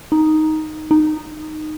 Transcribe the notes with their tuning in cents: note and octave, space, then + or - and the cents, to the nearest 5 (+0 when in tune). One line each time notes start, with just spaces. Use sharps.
D#4 +0
D#4 -15